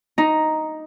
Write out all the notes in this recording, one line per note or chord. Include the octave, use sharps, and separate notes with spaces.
D#4